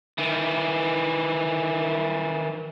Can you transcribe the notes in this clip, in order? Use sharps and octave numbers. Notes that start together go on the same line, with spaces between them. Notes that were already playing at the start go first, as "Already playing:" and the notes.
D#3 E3